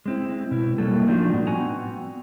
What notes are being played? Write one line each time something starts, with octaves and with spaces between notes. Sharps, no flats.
G#3 C4 E4
B2 E4
B2 F#3 G3 A#3 A4
F3 A3 D4 D#4 F4 F#4
A2 B3
B3 C4 F#4 F#5 G#5 A#5